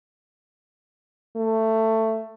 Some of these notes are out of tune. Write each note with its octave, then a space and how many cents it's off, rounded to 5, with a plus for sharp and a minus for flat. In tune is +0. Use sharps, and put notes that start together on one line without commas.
A3 +15